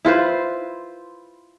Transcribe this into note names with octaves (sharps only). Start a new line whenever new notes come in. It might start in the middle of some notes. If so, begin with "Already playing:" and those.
E4 F4 B4 C5